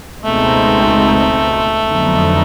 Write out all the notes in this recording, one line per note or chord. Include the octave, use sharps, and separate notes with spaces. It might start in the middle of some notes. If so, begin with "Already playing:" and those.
C#2 B2 G#3 A3 C4 D#4
F2 D3 F#3 B3 D#4